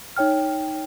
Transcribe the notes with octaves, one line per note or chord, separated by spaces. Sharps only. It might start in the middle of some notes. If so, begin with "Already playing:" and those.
D#4 C#5 G5 F6